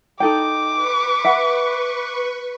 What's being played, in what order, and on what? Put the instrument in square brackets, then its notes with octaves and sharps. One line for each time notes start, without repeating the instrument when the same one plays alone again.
[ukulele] D#4 A4 G5 [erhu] D6
[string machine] B4 C#6
[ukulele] E5 F#5 B5